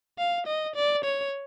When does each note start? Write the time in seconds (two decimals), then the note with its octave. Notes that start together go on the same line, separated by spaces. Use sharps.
0.19 F5
0.47 D#5
0.75 D5
1.05 C#5